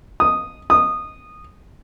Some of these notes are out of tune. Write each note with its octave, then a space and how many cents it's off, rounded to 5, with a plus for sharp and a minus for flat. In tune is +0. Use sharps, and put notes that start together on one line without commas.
D#6 -5
D#6 -15